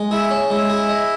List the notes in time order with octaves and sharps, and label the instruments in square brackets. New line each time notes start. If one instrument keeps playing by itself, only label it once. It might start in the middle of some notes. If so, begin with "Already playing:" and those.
Already playing: [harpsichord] G#3
[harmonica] E4 [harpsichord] G#4
[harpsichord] C#4
[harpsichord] G#3 [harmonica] E4
[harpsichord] G#4
D#5